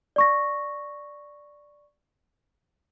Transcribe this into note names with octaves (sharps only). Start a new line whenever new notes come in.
D5 C#6 A#6